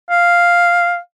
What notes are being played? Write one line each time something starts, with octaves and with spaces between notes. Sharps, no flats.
F5